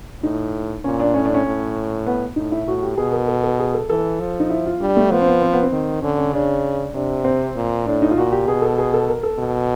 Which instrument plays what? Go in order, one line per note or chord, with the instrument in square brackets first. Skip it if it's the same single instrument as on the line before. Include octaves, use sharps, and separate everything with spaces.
[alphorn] A2 [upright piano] D#4
[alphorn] A#2 [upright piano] C#4
[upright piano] D4
[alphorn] A2 [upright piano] C#4
[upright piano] D4
C#4
[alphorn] A2
[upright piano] B3
[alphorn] A2 [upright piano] D#4
[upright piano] E4
[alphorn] A2 [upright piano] F#4
[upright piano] G4
[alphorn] B2 [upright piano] G#4
[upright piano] A#4
A4
A4
G#4
A4
[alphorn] E3 [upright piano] A4
[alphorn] F3
[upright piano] D#4
E4
F4
[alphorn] G3 [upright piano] D4
[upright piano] A3
[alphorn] F3 [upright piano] B3
[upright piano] C4
B3
C4
B3
C4
[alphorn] D#3
[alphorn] D3 [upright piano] C#4
[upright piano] C#4
[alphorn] C#3 [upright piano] D4
[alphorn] C3 [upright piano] D4
[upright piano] C4
[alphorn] A#2
[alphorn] A2 [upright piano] D4
[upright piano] D#4
F4
[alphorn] A#2 [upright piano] F#4
[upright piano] G4
[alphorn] B2 [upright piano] G#4
[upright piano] A4
G#4
A4
A#4
A4
[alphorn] B2